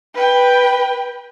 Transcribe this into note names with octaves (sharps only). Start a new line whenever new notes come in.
B4 G5